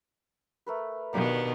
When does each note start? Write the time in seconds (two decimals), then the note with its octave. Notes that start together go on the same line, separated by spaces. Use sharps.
0.66 A3 A#4 B4
1.13 B2 D#3 A#3 B3 D4 G4